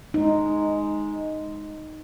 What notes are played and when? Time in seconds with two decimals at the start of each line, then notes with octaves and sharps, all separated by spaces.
0.14 G#3 D#4